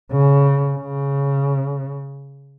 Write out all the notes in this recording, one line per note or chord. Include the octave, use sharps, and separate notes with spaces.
C#3
C#3